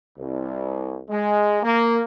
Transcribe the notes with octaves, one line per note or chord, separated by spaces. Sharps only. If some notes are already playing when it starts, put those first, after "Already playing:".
C2
G#3
A#3